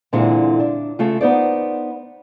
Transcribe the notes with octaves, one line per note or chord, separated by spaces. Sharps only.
A#2 D3 E3 G#3 C4 E4
D4
C#3 A3 F4
B3 D#4 C5 D5